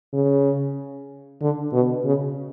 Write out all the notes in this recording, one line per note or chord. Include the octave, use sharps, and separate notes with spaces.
C#3
D3
B2
C#3